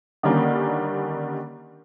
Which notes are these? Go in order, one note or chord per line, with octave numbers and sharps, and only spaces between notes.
D3 D#3 G3 A#3 C#4